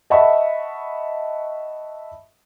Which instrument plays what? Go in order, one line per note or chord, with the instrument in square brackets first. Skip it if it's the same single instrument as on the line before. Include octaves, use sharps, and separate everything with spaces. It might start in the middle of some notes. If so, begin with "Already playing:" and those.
[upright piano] D#5 E5 F#5 A5 B5 C#6